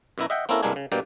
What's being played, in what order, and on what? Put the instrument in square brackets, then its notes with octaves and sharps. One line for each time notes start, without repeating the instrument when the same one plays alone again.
[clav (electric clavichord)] F#2 B2 E4 A#5
D#5 E5 F#5 G5
A#3 C4 C#4 E4 A4 A#4
C2 G2 G#3 A#3 D4 G#5
C#3
G2 B2 A#3 D5 G5